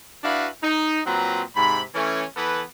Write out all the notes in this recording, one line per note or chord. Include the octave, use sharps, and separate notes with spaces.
D4 E4 F#4 B4 F5
D#4
A#2 F#3 C4 B4 A#5
G#2 C3 B5
E3 A3 C#4
E3 B3 A4 B4